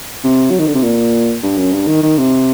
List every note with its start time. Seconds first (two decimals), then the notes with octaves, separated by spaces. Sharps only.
0.24 C3
0.51 F#3
0.59 D#3
0.68 D3
0.75 C3
0.83 A#2
1.43 G2
1.57 F#2
1.73 G2
1.88 D#3
2.03 D#3
2.18 C3